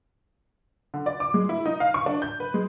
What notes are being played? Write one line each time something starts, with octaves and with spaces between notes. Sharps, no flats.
D3
D5
D6
G#3
E4
D#4
F5
C#6
D4
G6
B4
G#3